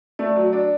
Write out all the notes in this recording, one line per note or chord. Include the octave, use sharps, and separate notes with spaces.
A3 D5
F#3
D4 D5